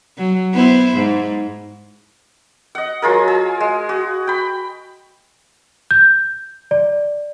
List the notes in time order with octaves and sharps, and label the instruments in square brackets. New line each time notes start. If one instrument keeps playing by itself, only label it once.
[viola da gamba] F#3
B3 E4 C5
G#2
[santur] D#5 F#5
F#3 F4 G#4 A#4
G#4
G#3
F#4
G5 B5
[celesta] G6
D5